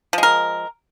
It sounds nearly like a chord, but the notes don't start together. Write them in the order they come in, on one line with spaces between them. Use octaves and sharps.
F3 G#3 A#4